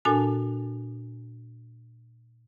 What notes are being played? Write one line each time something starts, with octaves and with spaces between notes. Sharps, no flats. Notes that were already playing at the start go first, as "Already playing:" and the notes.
A#2 D4 F#4 A4 G#5 A5